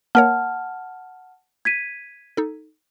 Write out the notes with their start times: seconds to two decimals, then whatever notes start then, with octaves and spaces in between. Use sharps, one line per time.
0.15 A#3 A#4 C#5 F#5 A5 F6
1.65 G#6 B6 D#7
2.37 D#4 A4